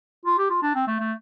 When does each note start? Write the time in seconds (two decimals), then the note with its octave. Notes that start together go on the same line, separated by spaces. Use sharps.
0.25 F4
0.38 G4
0.50 F4
0.62 D4
0.75 C4
0.87 A3
1.00 A3